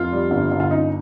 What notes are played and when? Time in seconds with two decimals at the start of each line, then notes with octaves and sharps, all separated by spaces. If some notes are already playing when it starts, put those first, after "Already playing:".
Already playing: F1 F4
0.12 G3
0.31 G1
0.52 G1
0.60 F4
0.71 C#3 D#4